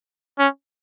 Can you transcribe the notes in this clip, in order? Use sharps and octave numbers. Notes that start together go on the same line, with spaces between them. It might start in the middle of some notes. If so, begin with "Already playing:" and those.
C#4